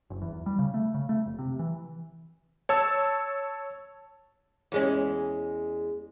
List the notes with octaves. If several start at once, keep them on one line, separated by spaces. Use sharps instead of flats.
F#1
E2
E2
G3
C#3
A3
C#3
A3
F1
C3
E3
C#5 A5 E6
E2 G#3 C#4